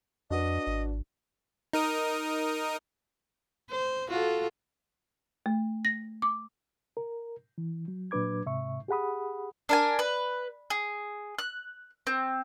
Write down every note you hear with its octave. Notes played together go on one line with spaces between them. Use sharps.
F2 D4 F#4 B4 D#5
G#1
D#4 A#4 D#6
C5
F4 F#4 A4
A3
A#6
D6
A#4
E3
F#3
A#2 F#3 D4 B4 D6 G#6
G#2 C3 E5 C#6
G4 G#4 F#5 B5 D#6
D4 A#4 G#5
B4
G#4
F#6
C4